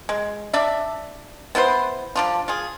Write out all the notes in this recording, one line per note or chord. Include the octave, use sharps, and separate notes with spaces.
G#3
D4 D5 E5
B3 E4 B4 C5
F3 D4 F4
F4 G#4